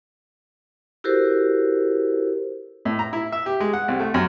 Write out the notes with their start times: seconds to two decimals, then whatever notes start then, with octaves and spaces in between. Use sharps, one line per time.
1.04 E4 F#4 G4 A4 A#4 C5
2.85 A2
2.99 A#5
3.13 E4
3.32 E5
3.46 G4
3.60 G#3
3.73 F#5
3.88 C2
4.00 A3
4.14 F#2